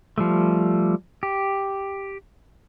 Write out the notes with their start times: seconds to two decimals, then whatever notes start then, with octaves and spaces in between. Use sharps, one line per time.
0.18 F3 G3 A3
1.23 G4